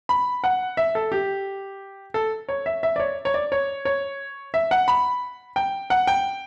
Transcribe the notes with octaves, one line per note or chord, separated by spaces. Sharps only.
B5
F#5
E5
A4
G4
A4
C#5
E5
E5
D5
C#5
C#5
D5
C#5
C#5
E5
F#5
B5
G5
F#5
G5